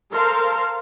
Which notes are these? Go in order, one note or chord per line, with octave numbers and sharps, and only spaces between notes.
A4 A#4 C5 F5